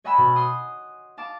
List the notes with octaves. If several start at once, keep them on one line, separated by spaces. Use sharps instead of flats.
C#5 D#5 F#5 G#5 B5 E6
B2
C6 D#6
F5 A5 D6